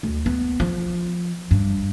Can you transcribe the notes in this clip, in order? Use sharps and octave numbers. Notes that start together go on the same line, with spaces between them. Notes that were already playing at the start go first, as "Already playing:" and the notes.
D2
B3
F3
G2